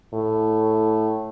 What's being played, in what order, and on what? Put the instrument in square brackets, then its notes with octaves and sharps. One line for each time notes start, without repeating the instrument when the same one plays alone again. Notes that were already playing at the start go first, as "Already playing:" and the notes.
[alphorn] A2